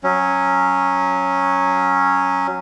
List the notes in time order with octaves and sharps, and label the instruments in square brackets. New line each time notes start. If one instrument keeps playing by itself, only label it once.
[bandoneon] F#3 C#4